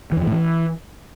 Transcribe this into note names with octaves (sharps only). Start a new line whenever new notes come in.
E3
F2
E3
A2
E3